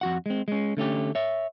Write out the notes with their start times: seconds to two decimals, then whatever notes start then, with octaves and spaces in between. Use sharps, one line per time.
0.01 F2 F#4 F#5
0.26 G#3 C4
0.48 G#3 C#4
0.77 D3 A3 C#4 G4
1.15 C#5 E5